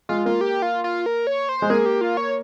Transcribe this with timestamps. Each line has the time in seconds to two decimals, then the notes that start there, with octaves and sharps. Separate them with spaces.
0.09 G#3 F4
0.26 A#3 F4
0.41 G4
0.62 F4
0.84 F4
1.06 A#4
1.27 C#5
1.49 C5
1.62 G#3
1.70 A#3 G#4
1.86 G4
2.01 F4
2.17 C#5